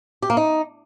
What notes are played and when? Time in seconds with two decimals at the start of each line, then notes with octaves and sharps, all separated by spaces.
0.22 G4
0.30 A#3
0.37 D#4